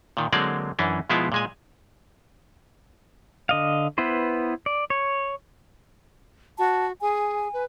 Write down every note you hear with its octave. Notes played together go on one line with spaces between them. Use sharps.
A#2 D#3
D3 F#3 G#3 A#3 C4 D5
F#2 E3 C#4 D4
B2 F3 G#3 B3 E4 F4
A#2 G#3 G#5
D3 D#5 F5
B3 E4 B4 C5
D5
C#5
F#4 A5
G#4 G#5
B4